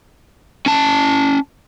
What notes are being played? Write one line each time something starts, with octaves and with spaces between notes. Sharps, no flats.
C#4 A5